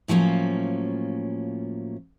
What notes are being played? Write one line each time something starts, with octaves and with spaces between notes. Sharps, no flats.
A2 F3 F#3 A#3 C#4